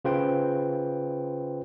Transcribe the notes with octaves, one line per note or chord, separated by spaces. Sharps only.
C#3 F4 B4 C5 G5